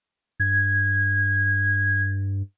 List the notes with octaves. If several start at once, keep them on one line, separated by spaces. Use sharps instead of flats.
G2 G#6